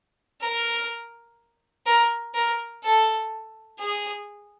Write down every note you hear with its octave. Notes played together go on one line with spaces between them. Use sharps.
A#4
A#4
A#4
A4
G#4